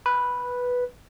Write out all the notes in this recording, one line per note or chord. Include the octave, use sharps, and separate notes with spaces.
B4